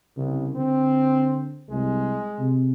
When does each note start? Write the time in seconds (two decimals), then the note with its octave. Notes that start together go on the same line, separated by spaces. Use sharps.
0.17 C2 C#3
0.56 D3 C4
1.70 C2 G#3
2.39 C3